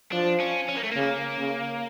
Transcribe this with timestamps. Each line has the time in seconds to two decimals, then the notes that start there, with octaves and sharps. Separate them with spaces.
0.12 F3 D4
0.40 C#4
0.69 C#4
0.77 A#3
0.84 A3
0.92 C#3 A#3
1.38 C#3